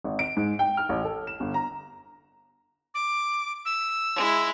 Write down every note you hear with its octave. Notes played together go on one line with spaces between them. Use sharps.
G#1
D7
G#2
G5
F6
A1
A4
E7
G1
A#5
D6
E6
G#3 E4